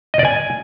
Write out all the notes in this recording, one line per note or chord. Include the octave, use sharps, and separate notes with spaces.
D#5
D5
G#5